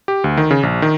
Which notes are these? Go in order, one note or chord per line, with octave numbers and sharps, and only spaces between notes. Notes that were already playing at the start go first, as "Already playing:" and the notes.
G4
D2
D#3
C#3
A#1
D#3